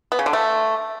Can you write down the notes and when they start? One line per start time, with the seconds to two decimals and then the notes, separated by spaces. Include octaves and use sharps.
0.12 B3
0.19 C#3
0.26 D3
0.33 A3